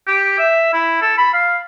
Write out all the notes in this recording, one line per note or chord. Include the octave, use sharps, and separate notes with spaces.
G4
E5
E4
A4
B5
F5